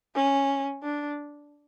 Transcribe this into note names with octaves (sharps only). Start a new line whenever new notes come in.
C#4
D4